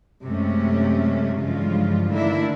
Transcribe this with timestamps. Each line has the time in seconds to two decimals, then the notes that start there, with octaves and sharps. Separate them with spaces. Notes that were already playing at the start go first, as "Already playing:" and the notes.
0.23 F#2 C3 G#3 A3 C#4
1.37 G2 C#3 E3 F3 G#3 F4
2.09 D3 D#3 A3 A#3 D4 E4